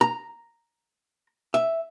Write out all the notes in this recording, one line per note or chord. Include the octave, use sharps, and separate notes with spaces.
A#5
E5